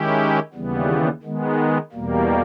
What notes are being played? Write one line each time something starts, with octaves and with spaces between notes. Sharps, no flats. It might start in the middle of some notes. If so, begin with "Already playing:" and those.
Already playing: D#3 G#3 C#4 E4 G4
D#2 C#3 E3 G3 B3
D#3 G#3 B3
E2 B2 G3 A#3